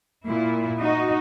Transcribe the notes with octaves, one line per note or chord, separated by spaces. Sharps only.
A#2 E4
D#4 F#4 D#5